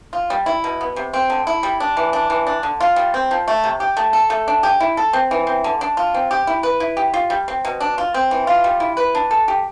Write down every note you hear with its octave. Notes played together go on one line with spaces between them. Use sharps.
F4
G3
E4
B2
B3
C3
C4
D3
E4
G3
D4
E3
D4
E3
D4
D3
F4
G3
C4
F3
A3
C3
G4
A3
A4
A3
D4
G4
E4
A4
C4
E3
C4
D3
D4
F4
C4
G4
E4
B4
E4
G4
F4
G3
C4
B2
D4
F4
C4
E3
F4
G3
E4
B4
D4
A4
G4